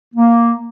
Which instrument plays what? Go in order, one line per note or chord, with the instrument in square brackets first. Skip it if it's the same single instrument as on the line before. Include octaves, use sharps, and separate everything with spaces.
[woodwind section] A#3